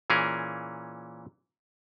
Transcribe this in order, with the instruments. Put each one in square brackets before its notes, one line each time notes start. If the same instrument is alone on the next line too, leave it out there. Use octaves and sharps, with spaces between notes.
[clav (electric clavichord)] A#2 E3 C#4 G#4 A#4